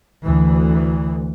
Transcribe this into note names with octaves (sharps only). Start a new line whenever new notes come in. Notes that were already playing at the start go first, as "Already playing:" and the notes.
D2 E3